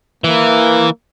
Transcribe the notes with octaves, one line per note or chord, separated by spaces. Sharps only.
E3 A#3